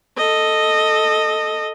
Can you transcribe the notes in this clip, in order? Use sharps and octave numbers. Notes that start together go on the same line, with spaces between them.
A4 D#5